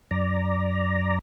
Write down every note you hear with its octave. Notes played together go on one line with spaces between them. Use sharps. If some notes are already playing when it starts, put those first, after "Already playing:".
F#2 D5 A#5